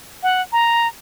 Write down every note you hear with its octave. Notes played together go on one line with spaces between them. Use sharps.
F#5
A#5